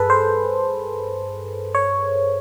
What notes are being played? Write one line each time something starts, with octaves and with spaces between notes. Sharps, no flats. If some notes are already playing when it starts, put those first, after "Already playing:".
Already playing: G2 G#4 A4 B4
C5
C#5